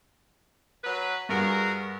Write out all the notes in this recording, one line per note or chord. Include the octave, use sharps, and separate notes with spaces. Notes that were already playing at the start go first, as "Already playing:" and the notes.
F#3 B4
G2 F#4 G#4 A#4